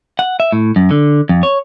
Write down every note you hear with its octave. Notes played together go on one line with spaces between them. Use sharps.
F#5
E5
A2
F#2
D3
F2
C#5